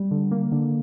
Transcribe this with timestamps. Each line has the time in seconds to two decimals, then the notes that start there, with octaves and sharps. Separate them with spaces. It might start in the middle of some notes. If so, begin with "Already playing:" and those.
Already playing: G3
0.11 D3
0.31 A#3
0.52 D3